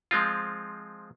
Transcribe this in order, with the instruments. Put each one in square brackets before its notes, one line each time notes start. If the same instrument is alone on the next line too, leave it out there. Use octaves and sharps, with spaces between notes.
[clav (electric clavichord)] F3 G#3 C4 F4